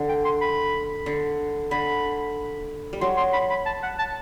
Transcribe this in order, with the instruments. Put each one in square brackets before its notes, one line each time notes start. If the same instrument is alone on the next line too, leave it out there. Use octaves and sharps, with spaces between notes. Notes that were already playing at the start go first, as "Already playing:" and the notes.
Already playing: [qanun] D3
[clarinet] G5
C6
B5
[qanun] D3
[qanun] D3 [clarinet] B5
[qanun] G3
[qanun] F#3 [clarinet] C6
[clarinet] C6
B5
B5
A5
F#5
A5